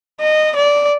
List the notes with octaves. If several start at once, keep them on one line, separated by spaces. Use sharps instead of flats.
D#5
D5